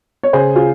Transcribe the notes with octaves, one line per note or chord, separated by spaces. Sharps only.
C#5
C#3 G#4 C5
F4 G#4